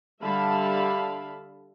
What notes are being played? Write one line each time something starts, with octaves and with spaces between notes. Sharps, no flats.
D3 G3 E5 F5 A5 B5